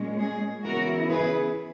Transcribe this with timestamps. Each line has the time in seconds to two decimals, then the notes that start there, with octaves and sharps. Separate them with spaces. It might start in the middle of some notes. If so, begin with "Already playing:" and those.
Already playing: A#2 G#3 C#4
0.19 G#4
0.64 C#3 E3 B3 E4 F#4 A#4
1.10 G#4 B4